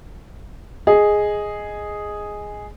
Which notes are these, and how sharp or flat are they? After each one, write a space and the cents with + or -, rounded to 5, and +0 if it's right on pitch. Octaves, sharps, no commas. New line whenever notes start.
G#4 +0 D#5 +0